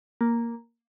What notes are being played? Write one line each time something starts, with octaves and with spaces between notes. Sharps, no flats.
A#3